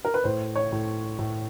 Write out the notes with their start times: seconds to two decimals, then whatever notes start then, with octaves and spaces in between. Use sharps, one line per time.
0.05 A#4
0.14 B4
0.24 A2 C5
0.56 C#5
0.72 A2
1.19 A2